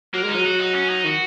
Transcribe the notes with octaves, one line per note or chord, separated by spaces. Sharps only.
F#3 A#3
G#3 D#4
F#3
F#4
D#4
C#4
D#4
D#3 F#4